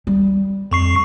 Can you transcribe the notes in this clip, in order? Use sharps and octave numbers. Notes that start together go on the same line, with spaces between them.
G3
F2 C#6 C7